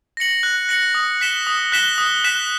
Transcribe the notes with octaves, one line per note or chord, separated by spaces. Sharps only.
A#6 C#7 F#7
F#6
A#6 C#7 F#7
D#6
F#6 B6 E7 G7
D#6
F#6 B6 E7 G7
D#6
F#6 B6 E7 G7